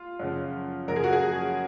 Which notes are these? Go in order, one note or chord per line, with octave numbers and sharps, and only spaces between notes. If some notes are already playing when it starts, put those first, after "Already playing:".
Already playing: F4
F#2 C#3 F3
F#2 C#3 F3 A#4
G#4
F#4
G#4